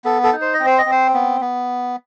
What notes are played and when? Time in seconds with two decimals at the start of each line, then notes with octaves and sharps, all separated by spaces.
0.05 B3 A4
0.24 A4
0.33 D#4
0.41 C5
0.54 D#5
0.60 C4
0.66 C5
0.78 D#5
0.86 C4
0.91 C5
1.14 B3
1.41 B3